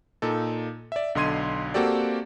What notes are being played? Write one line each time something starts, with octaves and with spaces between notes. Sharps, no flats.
A#2 D#4 A4
D5 E5
B1 D3 D#5 C6 G#6 D#7
A#3 C4 F#4 G4 A4 D5